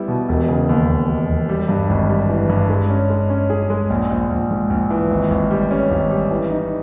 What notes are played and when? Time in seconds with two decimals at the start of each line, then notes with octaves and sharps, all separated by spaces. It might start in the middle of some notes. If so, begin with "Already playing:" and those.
Already playing: G3 B3 E4
0.08 B2
0.29 E1
0.49 C#3
0.69 D#2
0.89 E1
1.09 E1
1.29 E1
1.49 G3
1.69 G2
1.89 G#1
2.09 G3
2.29 E3
2.49 G2
2.70 G#3
2.90 C#4
3.10 G#3
3.30 C#4
3.50 G#4
3.70 G#3
3.90 A#1
4.11 A#1
4.30 A#1
4.50 G#2
4.70 A#1
4.90 E3
5.11 G#1
5.30 G#1
5.51 G3
5.71 C#4
5.91 G#1
6.11 G3
6.31 E3
6.51 D#4